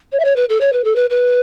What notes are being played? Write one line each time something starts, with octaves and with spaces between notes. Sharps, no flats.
C#5
E5
C#5
B4
A4
C#5
B4
A4
B4
B4